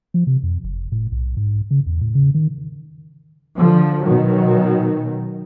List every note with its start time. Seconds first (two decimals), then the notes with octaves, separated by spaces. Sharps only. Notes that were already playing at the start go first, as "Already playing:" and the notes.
0.14 F3
0.27 C3
0.43 F2
0.64 F#1
0.92 A2
1.12 B1
1.37 G#2
1.71 C#3
1.86 E2
2.01 A2
2.15 C#3
2.34 D#3
3.58 D3 F3
4.06 B2 D#3 F#3